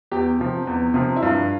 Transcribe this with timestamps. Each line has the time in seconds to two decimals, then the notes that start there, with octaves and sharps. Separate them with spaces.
0.11 E2 G4
0.40 C3 F3
0.67 E2
0.94 C3 F3
1.16 E4
1.22 G2 F4